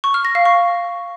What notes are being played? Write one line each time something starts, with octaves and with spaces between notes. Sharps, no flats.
C#6
F6
A#6
F5
C#6